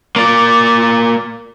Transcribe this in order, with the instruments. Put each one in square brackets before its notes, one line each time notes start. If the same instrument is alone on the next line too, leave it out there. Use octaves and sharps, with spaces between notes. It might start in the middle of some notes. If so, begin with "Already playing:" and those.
[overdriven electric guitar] A#3 D5